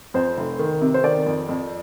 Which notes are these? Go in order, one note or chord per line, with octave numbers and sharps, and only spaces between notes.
F2 C5
F1
D#3
C3
C5
D#3 D5
F2
F2